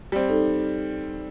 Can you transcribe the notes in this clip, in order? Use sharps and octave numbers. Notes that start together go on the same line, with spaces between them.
G3 C4
D#4 A4